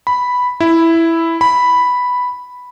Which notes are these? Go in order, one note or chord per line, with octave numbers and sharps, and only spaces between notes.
B5
E4
B5